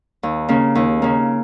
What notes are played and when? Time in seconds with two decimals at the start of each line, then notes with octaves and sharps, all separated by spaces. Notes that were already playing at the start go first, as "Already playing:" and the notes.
0.23 D#2
0.49 C#3 A#3
0.75 D#2
1.02 C#3 A#3